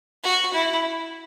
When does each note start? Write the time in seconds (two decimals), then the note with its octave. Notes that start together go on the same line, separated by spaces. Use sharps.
0.24 F#4
0.54 E4